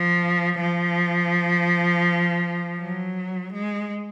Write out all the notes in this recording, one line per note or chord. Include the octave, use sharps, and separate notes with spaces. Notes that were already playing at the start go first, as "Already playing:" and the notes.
Already playing: F3
F3
F#3
G#3